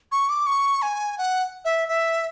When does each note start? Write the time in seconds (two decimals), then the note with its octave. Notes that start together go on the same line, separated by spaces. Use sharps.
0.12 C#6
0.29 D6
0.46 C#6
0.82 G#5
1.18 F#5
1.65 E5
1.88 E5